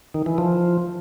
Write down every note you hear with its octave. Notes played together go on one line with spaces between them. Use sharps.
D#3
E3
F3